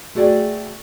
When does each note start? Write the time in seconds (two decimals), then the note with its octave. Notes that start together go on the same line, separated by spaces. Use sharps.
0.15 A3 F#4 G#4 D5 G5